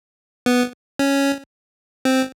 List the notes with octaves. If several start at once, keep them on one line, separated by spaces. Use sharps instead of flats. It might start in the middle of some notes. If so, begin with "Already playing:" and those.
B3
C#4
C4